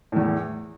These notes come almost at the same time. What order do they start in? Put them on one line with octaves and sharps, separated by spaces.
A2 E2 E3